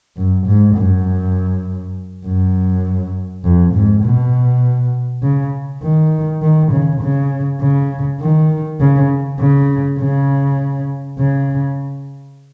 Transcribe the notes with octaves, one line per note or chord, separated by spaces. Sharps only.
F#2
G#2
F#2
F#2
F2
G#2
B2
C#3
D#3
D#3
C#3
C#3
C#3
D#3
C#3
C#3
C#3
C#3